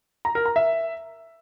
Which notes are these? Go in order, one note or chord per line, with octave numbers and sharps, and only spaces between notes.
A#5
A#4
A#5
E5